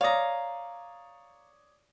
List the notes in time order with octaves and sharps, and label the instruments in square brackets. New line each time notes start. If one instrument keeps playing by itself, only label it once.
[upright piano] C#5 D5 D#6 [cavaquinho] F5 A#5